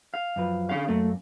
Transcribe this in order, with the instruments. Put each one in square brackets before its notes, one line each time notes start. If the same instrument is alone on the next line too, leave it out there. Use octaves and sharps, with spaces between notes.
[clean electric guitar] F5
[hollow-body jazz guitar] F#2 F3 B4
[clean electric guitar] D3 C#4 F5
[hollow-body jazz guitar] F#2 A#3 [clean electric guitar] A3